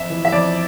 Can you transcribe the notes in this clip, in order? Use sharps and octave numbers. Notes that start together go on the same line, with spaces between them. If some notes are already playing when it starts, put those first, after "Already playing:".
Already playing: F2 E5
E3
E5
F2 D5